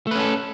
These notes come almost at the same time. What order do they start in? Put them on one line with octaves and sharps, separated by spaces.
A3 B4 C#4 A4